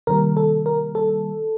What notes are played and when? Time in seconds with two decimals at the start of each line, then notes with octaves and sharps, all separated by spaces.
0.07 C3 D#3 G3 A#3 A#4
0.37 A4
0.66 A#4
0.95 A4